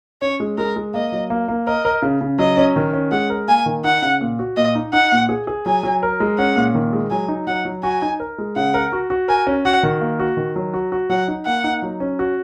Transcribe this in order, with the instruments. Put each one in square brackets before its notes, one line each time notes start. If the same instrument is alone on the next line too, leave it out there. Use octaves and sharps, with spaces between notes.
[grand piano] C#4 [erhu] C#5
[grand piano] G#3
[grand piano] G#3 [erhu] A#4
[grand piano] G#3
[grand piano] A#3 [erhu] D#5
[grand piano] F#3
A#3
A#3
[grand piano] A#4 [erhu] D#5
[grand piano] A#4
C#3
C#3
[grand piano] F#3 [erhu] D#5
[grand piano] C#4
D#3
C#4
[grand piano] G#3 [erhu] F#5
[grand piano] A#4
[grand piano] A#3 [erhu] G#5
[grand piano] D#3
[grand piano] D#4 [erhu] F#5
[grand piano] C#3
A#2
F#4
[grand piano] A#2 [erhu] D#5
[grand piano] D#4
[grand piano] D#4 [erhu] F#5
[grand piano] A#2
G#4
G#4
[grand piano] F#3 [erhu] G#5
[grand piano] F#3
A#4
G#3
[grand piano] C#4 [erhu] F#5
[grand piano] A#2
D#3
G#3
[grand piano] F#3 [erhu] G#5
[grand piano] D#4
[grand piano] F#3 [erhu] F#5
[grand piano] F#3
[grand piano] F#4 [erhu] G#5
[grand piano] D#4
A#4
G#3
[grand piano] C#3 [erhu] F#5
[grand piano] A#4
F#4
F#4
[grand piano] A#4 [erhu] G#5
[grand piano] C#4
[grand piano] F#4 [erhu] F#5
[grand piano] D#3
A#3
F#4
D#3
F#3
F#4
F#4
[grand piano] F#3 [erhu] F#5
[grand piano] D#4
[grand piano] A#3 [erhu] F#5
[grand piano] D#4
F#3
C#4
F#4